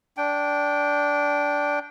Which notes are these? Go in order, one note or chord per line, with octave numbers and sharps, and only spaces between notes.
D4 G5